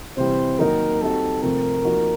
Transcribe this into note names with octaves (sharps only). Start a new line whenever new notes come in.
C3 E3 G3 C4 C5
D#3 F#3 A#3 D#4 A#4
G3 C4 D#4 F#4 A4
C3 F3 A3 C4 A#4
F3 A#3 D#4 F#4